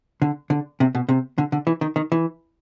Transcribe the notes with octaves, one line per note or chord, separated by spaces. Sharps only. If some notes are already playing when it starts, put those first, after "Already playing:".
D3
D3
C3
B2
C3
D3
D3
E3
D#3
D#3
E3